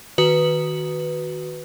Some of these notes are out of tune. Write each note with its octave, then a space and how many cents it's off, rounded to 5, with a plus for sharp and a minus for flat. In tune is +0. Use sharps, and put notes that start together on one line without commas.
D#3 +0 F#4 +0 B4 +0